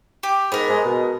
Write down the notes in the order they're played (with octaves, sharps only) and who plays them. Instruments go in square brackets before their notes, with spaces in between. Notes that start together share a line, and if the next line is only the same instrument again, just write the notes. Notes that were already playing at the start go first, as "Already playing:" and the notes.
[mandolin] G4
[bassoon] G#2 [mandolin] B3 A#4
[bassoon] G#3
B2